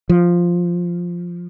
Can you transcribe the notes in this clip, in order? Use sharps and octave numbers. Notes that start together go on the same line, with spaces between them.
F3